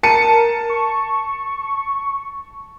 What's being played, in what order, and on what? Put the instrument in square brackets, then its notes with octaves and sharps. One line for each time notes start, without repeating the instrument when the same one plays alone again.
[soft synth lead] A#4 [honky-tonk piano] A5 C#7 D#7
[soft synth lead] C#6